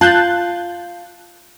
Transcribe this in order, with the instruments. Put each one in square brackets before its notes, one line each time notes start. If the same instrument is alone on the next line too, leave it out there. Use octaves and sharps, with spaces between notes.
[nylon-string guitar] F4 [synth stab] A5 F#6 G6